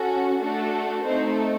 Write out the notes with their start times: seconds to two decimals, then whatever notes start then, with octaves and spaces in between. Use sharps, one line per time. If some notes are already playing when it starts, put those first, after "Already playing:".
Already playing: C#4 F#4 A4
0.41 A3 D4 F#4 A4
1.04 A3 C4 D#4 C5